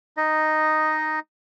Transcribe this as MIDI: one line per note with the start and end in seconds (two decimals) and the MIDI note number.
0.17 1.19 63
0.17 1.19 75